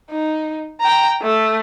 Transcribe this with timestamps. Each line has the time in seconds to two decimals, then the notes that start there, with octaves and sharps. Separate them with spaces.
0.11 D#4
0.81 G5 A#5
1.22 A3